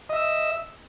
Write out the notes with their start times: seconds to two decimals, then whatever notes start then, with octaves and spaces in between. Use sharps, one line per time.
0.09 D#5
0.13 E5
0.16 E6